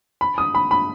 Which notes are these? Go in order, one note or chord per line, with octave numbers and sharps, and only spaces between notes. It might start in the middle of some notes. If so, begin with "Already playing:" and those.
B5
D#6
B5
B5